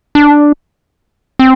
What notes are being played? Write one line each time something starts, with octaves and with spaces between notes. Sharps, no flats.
D4
C4